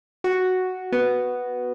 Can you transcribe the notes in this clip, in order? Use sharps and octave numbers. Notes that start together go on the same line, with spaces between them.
F#4
B3